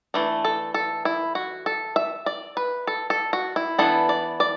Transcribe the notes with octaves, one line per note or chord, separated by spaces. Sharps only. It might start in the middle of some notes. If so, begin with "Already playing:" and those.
E3 A3 D4
A4
A4
E4
F#4
A4
E5
D5
B4
A4
A4
F#4
E4
E3 B3 D4 A4
D5
D5